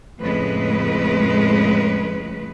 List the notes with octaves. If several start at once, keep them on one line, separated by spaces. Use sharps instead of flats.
F2 A2 C#3 G#3 B4